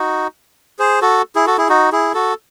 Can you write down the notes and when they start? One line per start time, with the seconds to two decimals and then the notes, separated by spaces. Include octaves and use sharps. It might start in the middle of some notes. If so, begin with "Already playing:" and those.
Already playing: D#4 F#4
0.79 G#4 C5
1.02 F#4 A4
1.35 E4 G#4
1.47 F#4 A4
1.58 E4 G#4
1.69 D#4 F#4
1.92 E4 G#4
2.14 F#4 A4